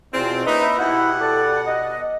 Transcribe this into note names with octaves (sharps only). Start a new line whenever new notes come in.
E2 B2 C4 F4
A#3 C#4 D#4 B4 E5
B2 E4 G4 F#5
A4 D5
D#5